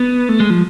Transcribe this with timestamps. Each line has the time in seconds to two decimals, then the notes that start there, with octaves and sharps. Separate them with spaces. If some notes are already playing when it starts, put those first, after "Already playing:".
Already playing: B3
0.29 A3
0.40 G#3
0.50 F3